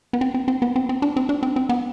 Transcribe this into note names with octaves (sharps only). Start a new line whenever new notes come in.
B3
C4
C4
C4
B3
C4
C4
D4
C4
D4
C4
C4
B3